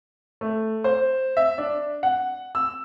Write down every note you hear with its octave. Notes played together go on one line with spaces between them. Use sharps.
A3
C5
E5
D4
F#5
E6